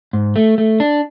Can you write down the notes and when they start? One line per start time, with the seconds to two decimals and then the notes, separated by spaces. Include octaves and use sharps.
0.13 G#2
0.36 A3
0.58 A3
0.80 D4